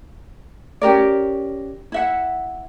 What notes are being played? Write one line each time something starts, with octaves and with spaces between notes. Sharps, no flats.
C#4 G4 A#4 D5
E4 E5 F#5